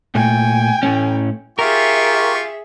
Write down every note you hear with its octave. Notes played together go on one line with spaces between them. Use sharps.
A#2 A3 G5 G#5
A2 A3 C#4
F4 G4 G#4 A#4 E5 C#6